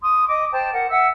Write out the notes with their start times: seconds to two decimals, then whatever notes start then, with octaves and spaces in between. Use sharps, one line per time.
0.01 C6 D#6
0.27 D#5 D6
0.51 C5 G5 A5
0.72 A#4 F#5
0.89 E5 F#5 E6